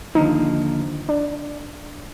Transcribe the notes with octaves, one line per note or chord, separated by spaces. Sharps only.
D#2 D3 F3 D#4
D4